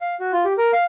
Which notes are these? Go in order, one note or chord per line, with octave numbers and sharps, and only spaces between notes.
F5
F#4
F4
G4
A#4
F5